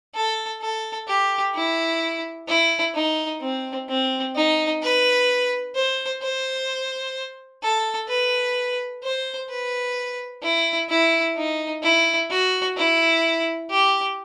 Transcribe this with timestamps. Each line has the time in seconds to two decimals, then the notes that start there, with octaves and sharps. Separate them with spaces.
0.15 A4
0.62 A4
1.08 G4
1.55 E4
2.48 E4
2.95 D#4
3.42 C4
3.89 C4
4.36 D#4
4.83 B4
5.75 C5
6.22 C5
7.63 A4
8.09 B4
9.03 C5
9.50 B4
10.43 E4
10.90 E4
11.36 D#4
11.83 E4
12.30 F#4
12.77 E4
13.70 G4